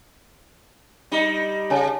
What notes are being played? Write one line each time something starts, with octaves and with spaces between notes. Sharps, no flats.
G3 D#4
C#3 C#5 G#5 A5